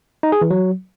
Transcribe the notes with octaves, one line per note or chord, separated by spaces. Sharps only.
D#4
G#4
E3
F#3